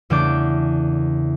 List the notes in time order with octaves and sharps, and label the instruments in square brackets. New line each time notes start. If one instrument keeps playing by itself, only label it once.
[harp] E2 C#3 A3 D4 D6 G6